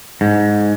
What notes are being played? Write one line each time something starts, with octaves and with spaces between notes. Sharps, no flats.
G#2